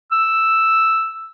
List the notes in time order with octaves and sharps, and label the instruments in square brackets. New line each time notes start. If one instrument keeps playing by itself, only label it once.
[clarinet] E6